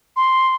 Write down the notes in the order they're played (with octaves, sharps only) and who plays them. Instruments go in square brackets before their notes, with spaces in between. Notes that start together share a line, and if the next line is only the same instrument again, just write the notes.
[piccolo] C6